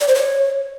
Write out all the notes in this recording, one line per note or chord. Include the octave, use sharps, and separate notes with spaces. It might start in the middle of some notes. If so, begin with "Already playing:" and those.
D5
C5
C#5